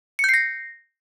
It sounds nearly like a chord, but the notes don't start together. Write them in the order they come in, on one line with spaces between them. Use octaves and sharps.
C#7 G6 C7 A#6